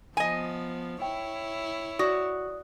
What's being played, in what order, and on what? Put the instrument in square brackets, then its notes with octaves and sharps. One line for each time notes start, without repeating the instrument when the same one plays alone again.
[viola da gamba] F3 B3 [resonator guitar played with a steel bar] D#5 G#5
[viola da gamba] E4 C#5 [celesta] G5
[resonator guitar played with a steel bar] F#4 [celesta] D5 D#6